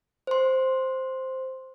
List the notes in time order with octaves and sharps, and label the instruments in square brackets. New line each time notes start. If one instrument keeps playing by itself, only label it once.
[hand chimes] C5 C6